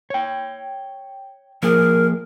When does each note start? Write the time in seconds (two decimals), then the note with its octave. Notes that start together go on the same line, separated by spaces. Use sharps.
0.10 C#5 G5
1.63 F3 A#3 G#4 A#4